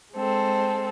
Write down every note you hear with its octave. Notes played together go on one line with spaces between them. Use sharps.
G#3 C4 A4